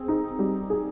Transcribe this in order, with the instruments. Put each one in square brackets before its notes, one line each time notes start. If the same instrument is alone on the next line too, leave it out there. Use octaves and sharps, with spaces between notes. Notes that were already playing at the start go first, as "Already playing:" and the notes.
Already playing: [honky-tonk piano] C4 G#4
D#4
G3
G#4